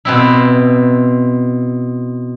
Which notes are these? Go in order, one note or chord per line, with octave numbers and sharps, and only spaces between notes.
B2 C4 E4